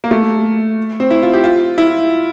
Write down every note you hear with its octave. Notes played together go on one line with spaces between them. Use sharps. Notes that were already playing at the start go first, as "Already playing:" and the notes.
A#3
A3
C4
E4
F4
G4
F4
E4